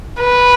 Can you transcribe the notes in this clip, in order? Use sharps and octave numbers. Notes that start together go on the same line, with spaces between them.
B4